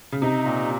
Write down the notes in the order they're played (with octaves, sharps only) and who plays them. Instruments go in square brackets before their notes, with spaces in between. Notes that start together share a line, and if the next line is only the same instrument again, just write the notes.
[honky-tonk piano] C#3
[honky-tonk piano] C3 [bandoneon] D#4
[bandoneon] A#2